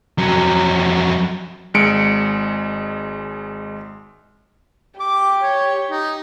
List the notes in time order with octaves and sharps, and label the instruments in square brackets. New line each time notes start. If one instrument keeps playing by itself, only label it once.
[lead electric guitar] F2 F#3
[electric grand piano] G#1 G#3 C#7 D7
[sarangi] G4 [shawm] D6
[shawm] C#5
D#4